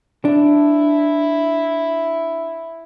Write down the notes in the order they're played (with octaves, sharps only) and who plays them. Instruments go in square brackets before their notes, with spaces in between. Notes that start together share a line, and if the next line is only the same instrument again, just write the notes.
[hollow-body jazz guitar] D4 [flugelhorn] E4